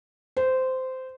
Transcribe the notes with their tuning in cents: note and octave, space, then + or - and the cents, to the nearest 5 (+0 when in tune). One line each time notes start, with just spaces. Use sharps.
C5 -15